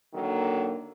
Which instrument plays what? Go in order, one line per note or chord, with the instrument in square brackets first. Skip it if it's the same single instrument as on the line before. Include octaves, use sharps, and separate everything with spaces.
[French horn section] D3 D#3 F#3 A#3